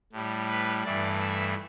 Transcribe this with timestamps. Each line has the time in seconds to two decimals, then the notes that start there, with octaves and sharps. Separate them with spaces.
0.13 A2 G3
0.48 B4
0.84 G2 E3 A3 D5
1.20 E5